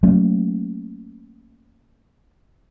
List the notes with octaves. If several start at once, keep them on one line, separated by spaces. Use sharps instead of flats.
F#3 A3 A#3 C#4